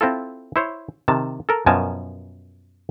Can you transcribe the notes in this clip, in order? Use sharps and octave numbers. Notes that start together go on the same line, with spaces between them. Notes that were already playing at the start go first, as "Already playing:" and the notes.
C4 E4 F4 A4
E4 C5 C#5
C3 D#3 A5
A4 A#4
F#2 B2 F3 A#4 G#5 A5